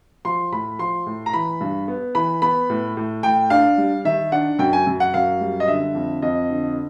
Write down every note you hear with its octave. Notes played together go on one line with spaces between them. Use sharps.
F3 C6
A2 B5
F3 C6
A2
A#5
E3 B5
G2
B3
E3 B5
B3 B5
A2
A2
A2 G5
D4 F5
G3
D#3 E5
D4 F#5
F#2 G5
G#5
F#2
F#5
F#2 F5
G3
D#5
D3 E5
F2
F2 D#5
D3